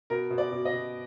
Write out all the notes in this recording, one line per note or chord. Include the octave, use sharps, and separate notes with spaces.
B2 A#4
B2
D5
B2
D#5
B2